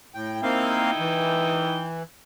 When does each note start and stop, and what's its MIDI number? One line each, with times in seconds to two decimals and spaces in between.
0.14 0.41 45
0.14 0.41 79
0.43 0.91 58
0.43 0.91 60
0.43 1.85 63
0.43 1.85 64
0.43 0.91 77
0.43 1.85 79
0.99 2.03 52